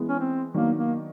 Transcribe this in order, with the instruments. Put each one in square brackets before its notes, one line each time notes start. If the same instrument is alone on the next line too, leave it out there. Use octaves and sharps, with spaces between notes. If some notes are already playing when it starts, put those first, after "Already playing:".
Already playing: [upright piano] E3 G#3 B3
[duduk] C#4
C4
[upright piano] D#3 F#3 B3 D4 [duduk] A#3
[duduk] A#3